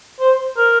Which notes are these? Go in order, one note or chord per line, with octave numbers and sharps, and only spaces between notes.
C5
A#4